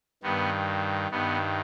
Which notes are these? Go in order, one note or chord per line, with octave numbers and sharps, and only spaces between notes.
G2 D#3 B3
G2 D#3 B3